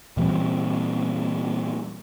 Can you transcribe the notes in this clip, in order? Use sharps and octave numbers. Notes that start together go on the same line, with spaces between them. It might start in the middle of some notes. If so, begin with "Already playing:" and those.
A#2 E3 G3 C4